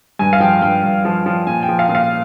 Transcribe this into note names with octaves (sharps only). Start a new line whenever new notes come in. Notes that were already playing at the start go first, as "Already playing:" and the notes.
G2 G#5
F5
F3 G5
G2 G5
G2
F3
F3
A#2 G#5
G5
F3
F5
A#2
F5